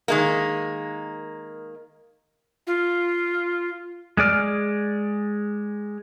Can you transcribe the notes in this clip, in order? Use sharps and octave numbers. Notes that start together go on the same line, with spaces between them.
D#3 G#3 A#3
F4
G#3 G#4 D5 F6